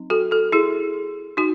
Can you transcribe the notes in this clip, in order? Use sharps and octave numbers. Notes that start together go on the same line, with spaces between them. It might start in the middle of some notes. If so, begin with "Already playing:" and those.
Already playing: F#3 C4 D#4
F#4 A4
F#4 A4
E4 G#4
D#4 F#4